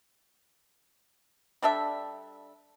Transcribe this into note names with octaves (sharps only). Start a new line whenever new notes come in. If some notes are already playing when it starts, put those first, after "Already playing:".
G3 D4 A4 E5